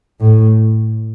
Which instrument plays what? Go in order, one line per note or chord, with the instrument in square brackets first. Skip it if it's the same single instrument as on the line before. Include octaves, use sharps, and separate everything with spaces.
[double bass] A2